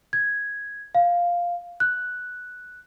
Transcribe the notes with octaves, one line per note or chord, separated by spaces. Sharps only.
G#6
F5
F#6